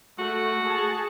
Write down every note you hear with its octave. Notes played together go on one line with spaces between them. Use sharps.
A3 F#4
G#4 A5